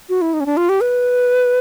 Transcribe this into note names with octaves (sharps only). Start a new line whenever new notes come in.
F#4
E4
D#4
C#4
D4
F4
G4
B4